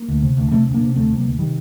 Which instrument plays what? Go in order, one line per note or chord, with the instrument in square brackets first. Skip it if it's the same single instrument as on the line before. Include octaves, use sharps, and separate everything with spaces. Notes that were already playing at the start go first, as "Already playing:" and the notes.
Already playing: [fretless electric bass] A#3
D2
C3
D2
C3 A3 C4
D2
A#3 D4
C3
D2 A3 C4
C3
G3 A#3
D2
C3 D#3 G3